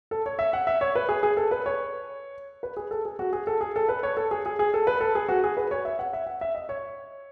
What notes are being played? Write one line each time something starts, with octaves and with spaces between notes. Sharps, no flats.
A4
C#5
E5
F#5
E5
C#5
B4
G#4
G#4
A4
B4
C#5
B4
G#4
A4
G#4
F#4
G#4
A4
G#4
A4
B4
C#5
A4
G#4
G#4
G#4
A4
B4
A4
G#4
F#4
G#4
B4
C#5
E5
F#5
E5
F#5
E5
D#5
C#5